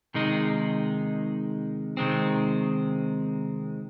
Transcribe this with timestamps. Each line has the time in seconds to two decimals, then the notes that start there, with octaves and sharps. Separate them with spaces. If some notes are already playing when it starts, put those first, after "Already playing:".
0.14 C3 D#3 G#3 D#4
1.97 C3 D#3 G#3 C4